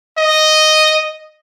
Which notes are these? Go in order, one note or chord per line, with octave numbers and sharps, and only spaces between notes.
D#5